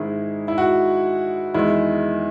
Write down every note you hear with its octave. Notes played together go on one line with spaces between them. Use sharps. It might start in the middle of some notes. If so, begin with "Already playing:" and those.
Already playing: G#2 D#3 G#3 E4 G#4
E4
F#4
E2 D#3 G#3 E4